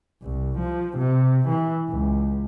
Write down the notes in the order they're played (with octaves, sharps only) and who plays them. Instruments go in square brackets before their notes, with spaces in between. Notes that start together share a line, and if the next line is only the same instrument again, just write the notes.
[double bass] C2
F3
C3
E3
C#2